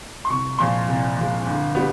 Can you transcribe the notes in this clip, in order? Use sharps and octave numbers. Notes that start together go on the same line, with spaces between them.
C6
C2 C#6
A#2 F3 G#3 C6
C2
A#2 F3 G#3
G1
G3 B3